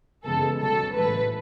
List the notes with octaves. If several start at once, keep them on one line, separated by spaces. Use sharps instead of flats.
F#2 C#3 E3 G#3 B3 A4
C#2 B2 F#3 A4
A1 G#2 E3 B4